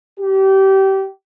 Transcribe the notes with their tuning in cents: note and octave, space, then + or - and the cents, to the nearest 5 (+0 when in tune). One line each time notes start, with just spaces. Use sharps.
G4 -25